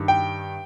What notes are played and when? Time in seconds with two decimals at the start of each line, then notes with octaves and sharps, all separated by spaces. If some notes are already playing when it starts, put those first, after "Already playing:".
Already playing: G2 D#3
0.08 G5